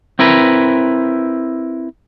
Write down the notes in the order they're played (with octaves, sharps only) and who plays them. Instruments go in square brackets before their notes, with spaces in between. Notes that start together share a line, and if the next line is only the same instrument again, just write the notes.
[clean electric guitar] C4 E4 A#4 B4